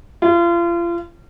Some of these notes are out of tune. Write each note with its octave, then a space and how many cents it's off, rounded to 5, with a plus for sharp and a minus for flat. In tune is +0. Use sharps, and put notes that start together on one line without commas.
F4 -35